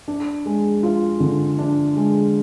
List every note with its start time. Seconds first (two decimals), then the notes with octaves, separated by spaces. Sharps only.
0.08 D4
0.46 G#3
0.83 F4
1.20 D3
1.58 D4
1.96 G#3